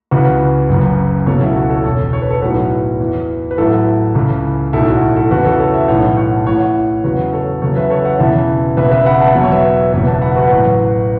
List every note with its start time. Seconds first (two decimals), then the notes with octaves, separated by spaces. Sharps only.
0.11 C#2 C#3 E3 F#4 B4
0.69 F#1 F#2 C#3
1.27 C#2 B2 F#3 A4 C#5
1.41 E4
1.51 A4
1.56 F#4
1.70 A4 C#5
1.84 E1 E2 E3 A4 C#5
2.13 C#5
2.22 B4
2.30 A4 C#5
2.42 B1 A2 F#3 F#4 B4
3.00 E2 E3
3.51 B4
3.58 A1 A2 F#3 E4 A4
4.15 C#2 C#3 E3
4.73 B1 A2 F#3 E4 A4
4.87 F#4
5.02 F#4
5.16 E4 A4
5.31 E2 C#3 E3 F#4 B4
5.45 E4 A4
5.59 A4 C#5
5.74 B4 E5
5.88 B1 A2 E3 C#5 F#5
6.17 C#5 F#5
6.37 A5
6.46 A1 A2 E3 C#5 F#5
7.04 E2 C#3 F#3 F#4 B4
7.33 A4 C#5
7.62 E2 C#3 F#3 A4 C#5
7.76 B4 E5
7.90 A4 C#5
8.05 C#5 F#5
8.19 E1 E2 C#3 E3 E5 A5
8.77 E1 E2 C#3 B4 E5
8.92 B4 E5
9.06 F#5 B5
9.20 E5 A5
9.35 E2 B2 F#3 E5
9.44 C#5
9.52 B4 E5
9.93 F#1 E2 B2 B4 E5
10.07 E5 A5
10.21 F#5 B5
10.36 F#4 B4
10.51 A1 A2 F#3